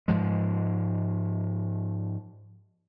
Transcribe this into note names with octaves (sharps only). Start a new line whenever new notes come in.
G#2 F3 G#3